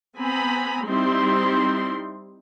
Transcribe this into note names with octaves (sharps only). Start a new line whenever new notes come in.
B3 C4 G#5 A#5 B5
G3 C4 D#4 E4 C6